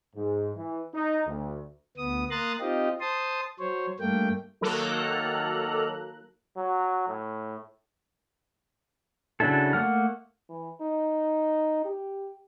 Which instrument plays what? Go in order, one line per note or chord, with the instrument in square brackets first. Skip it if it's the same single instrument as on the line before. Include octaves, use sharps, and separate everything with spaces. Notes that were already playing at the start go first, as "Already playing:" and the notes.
[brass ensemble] G#2
E3
D#4
D2
[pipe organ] D2 B3 D#6
A#3 A#5 C6 D#6 F#6 A6
C4 D#4 F4 G4 D#5
C5 A5 C6 D#6
F#3 C5 C#5
G2 A3 A#3 G5
[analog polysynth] D#3 F#3 A#3 A4 A#5 F#6
[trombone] F#3
A2
[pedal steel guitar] C#3 F#3 D4 E4 A4
A3 A#3 F#5 F6
[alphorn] E3
D#4
G4